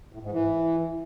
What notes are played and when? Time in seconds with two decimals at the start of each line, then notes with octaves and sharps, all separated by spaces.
0.13 A2
0.22 G#2
0.32 E3